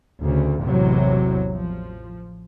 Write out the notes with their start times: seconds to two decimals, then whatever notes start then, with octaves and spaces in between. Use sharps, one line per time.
0.21 D2 C#3
0.62 A1 E2 C3 F#3
1.53 F3